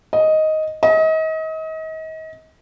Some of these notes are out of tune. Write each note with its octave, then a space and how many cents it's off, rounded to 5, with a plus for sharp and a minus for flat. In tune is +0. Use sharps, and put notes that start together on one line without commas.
D#5 +5
D#5 +35